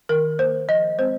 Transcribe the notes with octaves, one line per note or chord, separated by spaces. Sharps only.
D#3 A#4
A#3 C5
F3 D#5
G#3 C4 C5